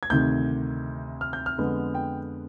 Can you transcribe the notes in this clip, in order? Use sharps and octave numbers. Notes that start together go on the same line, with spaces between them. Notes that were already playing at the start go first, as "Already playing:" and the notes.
G#6
D2 C3 D#3 G6
F6
G6
F6
F2 D3 G#3 B3
G5